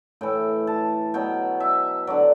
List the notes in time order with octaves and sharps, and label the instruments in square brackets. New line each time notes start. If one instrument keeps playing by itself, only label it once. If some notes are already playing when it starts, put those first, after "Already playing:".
[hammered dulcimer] A2 E3 G5
A5
B2 F#3 G5
E5
D3 F#3 D5